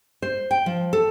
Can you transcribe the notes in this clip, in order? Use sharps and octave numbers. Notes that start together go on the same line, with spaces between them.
C5
G5
F3
A4